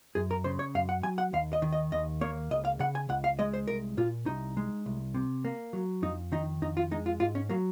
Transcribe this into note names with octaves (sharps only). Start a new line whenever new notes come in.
F#2 G#4
A#4
C#3 C5
C#5
F#2 F5
F#5
F#3 G#5
F#5
D#2 F5
D#5
D#3
D#5
D#2 D#5
A#3 C#5
C#2 D#5
F5
C#3 F#5
G#5
C#2 F#5
F5
G#3 D#5
C5
C2 A#4
A#2 F4
C2 D#4
G#3
C2
C3
A#3
F#3
F2 D#4
D#3 D#4
F2 D#4
F4
G#3 D#4
F4
G#2 F4
C#4
F#3 A#3